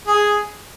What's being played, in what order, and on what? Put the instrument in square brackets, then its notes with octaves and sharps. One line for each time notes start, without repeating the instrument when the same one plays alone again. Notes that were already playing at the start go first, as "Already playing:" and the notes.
[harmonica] G#4